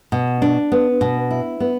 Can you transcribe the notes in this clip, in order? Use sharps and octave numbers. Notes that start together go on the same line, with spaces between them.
B2
D4
B3
B2
E4
B3